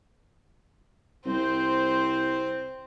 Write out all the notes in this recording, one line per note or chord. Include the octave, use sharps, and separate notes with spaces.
C2 C4 C5